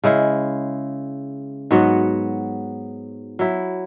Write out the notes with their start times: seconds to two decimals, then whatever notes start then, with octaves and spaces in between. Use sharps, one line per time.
0.04 C#3 G#3 E4
1.71 G#2 F#3 B3 F#4
3.39 F#3 E4